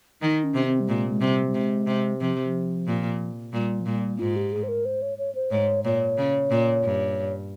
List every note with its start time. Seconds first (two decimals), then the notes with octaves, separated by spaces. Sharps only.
0.22 D#3 D#4
0.44 C#4
0.54 C3
0.66 C4
0.80 G3
0.88 A#2 G#3
1.10 G#3
1.21 C3 G3
1.47 G3
1.54 C3 G#3
1.87 C3
2.20 C3 F3
2.44 F3
2.87 A#2
3.53 A#2 G3
3.81 F3
3.86 A#2 G3
4.19 G#2 F4
4.36 G4
4.52 G#4
4.63 C5
4.69 A#4
4.85 C5
5.02 C#5
5.18 C#5
5.35 C5
5.51 G#2 C#5
5.85 A#2 C#5
6.18 C#3
6.51 A#2
6.84 G2